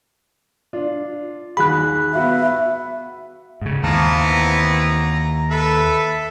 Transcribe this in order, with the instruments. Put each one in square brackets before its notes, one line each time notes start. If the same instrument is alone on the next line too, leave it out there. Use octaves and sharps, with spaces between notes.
[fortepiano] D4 F4
[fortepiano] D#2 F#4 G#4 [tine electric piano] B5 F#6
[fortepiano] B3 F#4 F5 [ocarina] E5
[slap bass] G#2 C#3
[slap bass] D#2 [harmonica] E3 B3 C4 [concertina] F5 A5 A#5
[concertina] A#5
[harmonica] A4 B4 A5 [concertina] E5